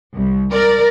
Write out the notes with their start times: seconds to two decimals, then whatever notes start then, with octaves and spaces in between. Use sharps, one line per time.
0.15 C2
0.52 A#4 D5